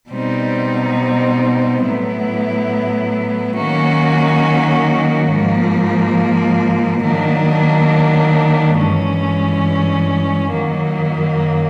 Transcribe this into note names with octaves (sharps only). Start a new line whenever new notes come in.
B2 G3 C4 D#4
A2 F#3 B3 E4
D#3 F#3 A#3 C#4 F#4
G#2 F3 A#3
D#3 F#3 A#3 D4
G2 E3 G#3 C#4
F#2 D#3 F#3 A#3